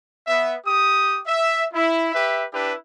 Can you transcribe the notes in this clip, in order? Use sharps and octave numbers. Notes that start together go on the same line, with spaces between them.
B3 E5
G4 D#6
E5
E4
G4 B4 E5
D4 E4 G4 B4